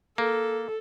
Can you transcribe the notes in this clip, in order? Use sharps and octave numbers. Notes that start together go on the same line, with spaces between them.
A#3 A4